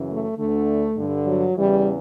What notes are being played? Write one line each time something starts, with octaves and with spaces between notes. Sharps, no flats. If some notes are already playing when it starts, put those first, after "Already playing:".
Already playing: F#2 C#3 E3
A3
D2 D3 A3
G2 D3
F#3
E2 C#3 E3 G3